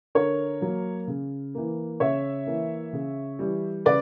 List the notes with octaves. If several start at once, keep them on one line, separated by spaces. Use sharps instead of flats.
D3 A#4 C#5
F#3 A#3
C#3
E3 A#3
C#3 C#5 E5
E3 A#3
C#3
E3 G3
C#3 B4 D5